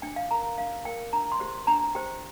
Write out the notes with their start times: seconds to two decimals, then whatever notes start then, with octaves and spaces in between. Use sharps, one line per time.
0.02 D4 G5
0.16 F5
0.31 A#4 A#5
0.58 D4 F5
0.85 A#4 G5
1.13 D4 A#5
1.32 C6
1.40 G4 C5
1.67 D4 A#5
1.95 G4 C5 G5